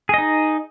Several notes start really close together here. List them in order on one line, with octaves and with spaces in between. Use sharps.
G#4 D#5 D#4